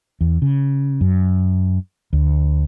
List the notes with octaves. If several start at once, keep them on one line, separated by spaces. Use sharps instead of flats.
E2
C#3
F#2
D2